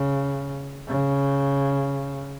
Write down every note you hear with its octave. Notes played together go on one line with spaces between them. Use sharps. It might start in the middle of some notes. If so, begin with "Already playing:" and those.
Already playing: C#3
C#3